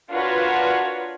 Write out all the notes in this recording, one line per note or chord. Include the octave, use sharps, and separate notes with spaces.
D4 F4 F#4 A#4 B4 C#5